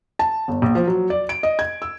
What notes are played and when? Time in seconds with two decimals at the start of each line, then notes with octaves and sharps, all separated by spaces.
0.19 A5
0.48 G1
0.62 A#1
0.75 F3
0.87 F#3
1.10 D5
1.29 D7
1.43 D#5
1.59 G#6
1.82 E6